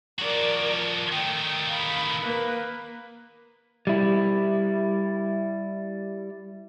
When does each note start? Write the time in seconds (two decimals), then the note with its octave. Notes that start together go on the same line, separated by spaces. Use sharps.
0.19 F3 F#4 A#4 D5
1.12 D#3 A3 G5
1.68 F5 B5
2.19 A#3 B4
3.87 G3 E4